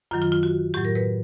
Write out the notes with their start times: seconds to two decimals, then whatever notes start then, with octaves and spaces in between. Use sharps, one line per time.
0.11 F#2 D#3 F#3 F4
0.22 F4
0.32 F4
0.43 F#4
0.74 A2 F#3 G4
0.85 A#4
0.95 B4